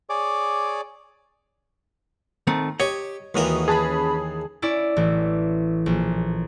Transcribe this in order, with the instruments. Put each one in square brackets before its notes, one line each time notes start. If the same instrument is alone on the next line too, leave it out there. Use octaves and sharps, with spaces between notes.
[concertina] G#4 C#5 D5 D6
[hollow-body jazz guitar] D#3 A3 C4
[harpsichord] G4 [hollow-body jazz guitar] C#5 D#5
[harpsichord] D#2 E3 A#4 [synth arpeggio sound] G#3 F#4 D#6
[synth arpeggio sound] C#4 B4 B5 [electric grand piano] G#4 A5
[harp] C#4 E4 D5
A1 E3
A#1